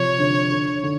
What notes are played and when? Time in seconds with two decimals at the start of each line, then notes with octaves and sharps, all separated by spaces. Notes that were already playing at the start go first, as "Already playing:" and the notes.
Already playing: C3 F3 C#5
0.19 D3
0.51 D3
0.83 D3